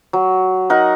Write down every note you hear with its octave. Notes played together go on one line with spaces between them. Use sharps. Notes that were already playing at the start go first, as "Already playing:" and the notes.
F#3
D#4 A#4 F#5